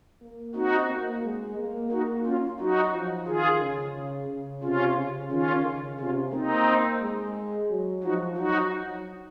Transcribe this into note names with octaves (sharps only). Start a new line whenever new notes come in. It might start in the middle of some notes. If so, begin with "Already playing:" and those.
A#3
C4 D#4 F#4
A#3
G#3
A#3
A#3 D#4 F#4
C#4 F4
F#3 D#4 F#4
F3
D#3 F4 G#4
C#3
C#3
C3 C#4 F4
C#3
D#3 C#4 F4
C#3
C3 C#4 F4
A#3 C4 D#4
G#3
F#3
F3 D#4 F#4
F#3 D#4 F#4